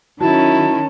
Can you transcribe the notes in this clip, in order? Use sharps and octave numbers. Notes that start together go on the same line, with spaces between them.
D#3 F#3 C#4 E4 A5